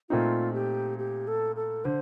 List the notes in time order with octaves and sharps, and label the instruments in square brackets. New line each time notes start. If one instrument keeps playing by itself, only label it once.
[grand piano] A#2 A3 C4 D#4 [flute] F4
[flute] G4
G4
A4
A4
[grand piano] D3 [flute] C5